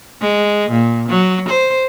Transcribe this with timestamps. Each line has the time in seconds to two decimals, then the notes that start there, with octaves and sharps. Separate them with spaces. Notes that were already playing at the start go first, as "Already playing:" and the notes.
0.21 G#3
0.71 A#2
1.09 F#3
1.49 C5